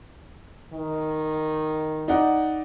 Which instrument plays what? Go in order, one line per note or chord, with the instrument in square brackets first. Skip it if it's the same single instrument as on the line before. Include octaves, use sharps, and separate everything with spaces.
[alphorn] D#3
[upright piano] D#4 D5 F#5